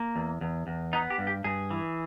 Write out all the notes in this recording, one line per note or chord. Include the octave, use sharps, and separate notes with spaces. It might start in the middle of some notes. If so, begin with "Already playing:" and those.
Already playing: A#3
E2
E2
E2
B3 D#4
G4
G2
G4
G2 G#4
E3